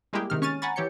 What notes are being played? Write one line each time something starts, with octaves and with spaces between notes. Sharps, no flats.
G3 G#3 A#3 E4 G4 G#4
C3 D#3 F6
C#4 C#6 F6 A6 D#7
F#5 G#5 A#5 B5 C#6 A6
E3 G4 C#5 G6 C#7